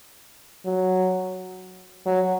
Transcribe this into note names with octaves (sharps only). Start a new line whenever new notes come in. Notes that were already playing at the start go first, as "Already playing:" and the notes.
F#3
F#3